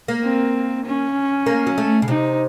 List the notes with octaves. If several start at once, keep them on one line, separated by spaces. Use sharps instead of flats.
A#3
C4
C#4
A#3
F#3
A3
C#3
C3 D#4